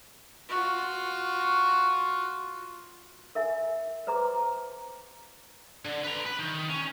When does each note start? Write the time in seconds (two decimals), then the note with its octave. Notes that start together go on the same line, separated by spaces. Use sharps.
0.49 F4 F#4
3.35 A#4 E5 G#5
4.07 B4 C5 A#5 C6 D6
4.38 A5
5.85 D3
6.03 B4 A#5
6.26 B4
6.39 D#3
6.70 C#4